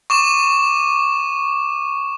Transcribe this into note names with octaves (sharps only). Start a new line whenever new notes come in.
C#6 D6 E7